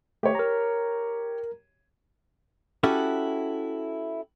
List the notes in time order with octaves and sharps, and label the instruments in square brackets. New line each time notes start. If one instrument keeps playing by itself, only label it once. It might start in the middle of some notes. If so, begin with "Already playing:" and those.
[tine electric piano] A3 [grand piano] G4 C#5
[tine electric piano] A#4 A#5
[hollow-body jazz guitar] C#4 E4 F#4 G4 A4